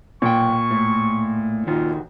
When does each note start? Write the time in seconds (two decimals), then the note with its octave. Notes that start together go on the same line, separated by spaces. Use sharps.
0.22 B1 A#2 G5 C#6
0.71 A2
1.67 D#2 D#3 F4 F#4